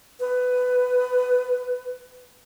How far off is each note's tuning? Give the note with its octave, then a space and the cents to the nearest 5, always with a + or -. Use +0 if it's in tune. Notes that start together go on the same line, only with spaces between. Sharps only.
B4 +15